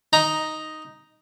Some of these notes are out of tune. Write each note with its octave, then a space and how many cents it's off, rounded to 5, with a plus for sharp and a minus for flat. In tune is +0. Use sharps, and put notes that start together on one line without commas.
D#4 +0 A#5 +5